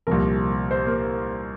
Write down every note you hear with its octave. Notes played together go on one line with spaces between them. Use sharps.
C2 A#2 F3 A#4
C5
A#3